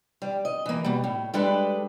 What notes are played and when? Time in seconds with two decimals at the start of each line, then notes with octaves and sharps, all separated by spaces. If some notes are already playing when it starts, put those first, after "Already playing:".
0.22 G3
0.45 D#5
0.66 E3 A#3
0.84 B2 G3
1.04 A2
1.34 G3 G#3 D4 A4 B4